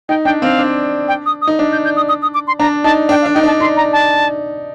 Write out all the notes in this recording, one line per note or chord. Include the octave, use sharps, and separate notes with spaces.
D#4 G5
D4 G5
C4 F5
D4
G5
D#6
D#6
D#4
D4
G6
G6
D#6
D#6
D#6
D6
C6
D4 A#5
D#4 A5
D4 G5
F5
D4
D#4 G5
D4 A5
D#4 C6
A#5
A5